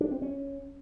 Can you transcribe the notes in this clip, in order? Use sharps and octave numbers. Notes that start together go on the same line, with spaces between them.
D4
C4
C#4